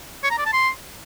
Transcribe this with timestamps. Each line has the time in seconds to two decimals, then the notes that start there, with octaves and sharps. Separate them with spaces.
0.24 C#5
0.31 A#5
0.38 D5
0.46 A5
0.53 C6